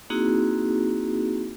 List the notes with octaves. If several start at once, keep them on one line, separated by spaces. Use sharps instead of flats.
A#3 C4 D#4 E4 F#4 G#4